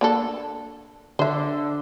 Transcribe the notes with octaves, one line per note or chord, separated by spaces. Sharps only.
A#3 D4 A4
D3 C5 E5